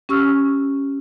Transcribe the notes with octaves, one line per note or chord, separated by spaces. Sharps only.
C#4 G4 C#6 E6 F6